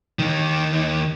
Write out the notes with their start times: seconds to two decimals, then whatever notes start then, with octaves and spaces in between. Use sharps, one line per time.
0.19 D#2 D#3